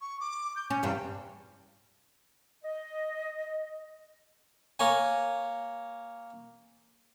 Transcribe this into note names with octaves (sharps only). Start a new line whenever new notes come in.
C#6
D6
G6
C#4 G6
E2 G2 C3 G5
D#5
A#3 C#5 G#5